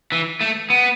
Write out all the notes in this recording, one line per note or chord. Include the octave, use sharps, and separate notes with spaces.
E3
A3
B3